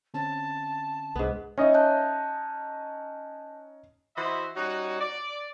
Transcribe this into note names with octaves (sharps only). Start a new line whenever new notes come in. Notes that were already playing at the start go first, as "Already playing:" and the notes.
D3 C4 C#4 A5
C2 G#2 B3 D4
C#4 D#4 C#5 D#5 E5
A5 F#6 G6
E3 F#4 C5 D#5 E5 B5
G3 C#4 D#4 F#4
D5